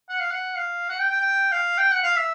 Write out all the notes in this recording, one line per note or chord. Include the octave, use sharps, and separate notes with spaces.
F#5
F5
F#5
F5
F#5
G5
G5
G5
F5
G5
F#5
F5
E5